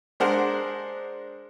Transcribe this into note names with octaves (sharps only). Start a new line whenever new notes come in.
G#3 D4 A#4 C5 F#5